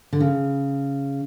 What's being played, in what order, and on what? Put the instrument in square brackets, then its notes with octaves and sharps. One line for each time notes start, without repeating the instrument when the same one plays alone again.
[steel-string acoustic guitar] D3
C#3